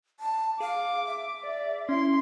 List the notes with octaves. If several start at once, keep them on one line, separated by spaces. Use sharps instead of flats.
A5
G#4 F5 D6
E5
D5
C#4 E4 C6